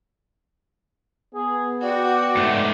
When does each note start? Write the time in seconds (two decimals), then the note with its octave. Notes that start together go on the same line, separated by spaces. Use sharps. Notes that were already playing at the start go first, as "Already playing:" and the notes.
1.35 B3 G#4
1.83 F#4 D5 G5
2.36 G#2 A3